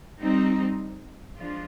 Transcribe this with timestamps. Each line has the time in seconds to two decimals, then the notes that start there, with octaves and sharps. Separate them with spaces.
0.20 G3 C4 D#4
1.36 F3 G#3 D4 F4